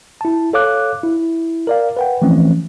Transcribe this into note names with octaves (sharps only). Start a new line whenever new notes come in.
E4 A5
A4 C#5 F5 D6 F#6
E4
A#4 D5 F5
B4 F#5 G5
E3 F3 A3 C4 C#4